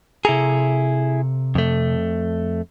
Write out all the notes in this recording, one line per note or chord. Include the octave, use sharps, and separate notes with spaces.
C3 E4 G#4 A4 A#5
F2 A3